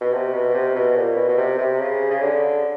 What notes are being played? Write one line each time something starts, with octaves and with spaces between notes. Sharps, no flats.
B2
C3
B2
C3
B2
A#2
B2
B2
C3
C3
C#3
C#3
D3